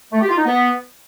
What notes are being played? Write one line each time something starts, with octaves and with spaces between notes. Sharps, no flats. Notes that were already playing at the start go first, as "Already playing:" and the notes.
A3
G4
F4
D#4
B3